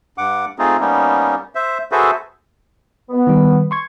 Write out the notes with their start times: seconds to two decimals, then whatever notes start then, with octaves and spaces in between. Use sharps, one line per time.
0.18 G2 F#5 D6
0.59 A3 C4 D#4 F4 G#4
0.80 G3 A#3 B3 C#4 D#4
1.55 C5 E5
1.92 F#4 G#4 A4 B4 C5 E5
3.10 B3
3.27 D#3 G3
3.71 C6 C#6 G#6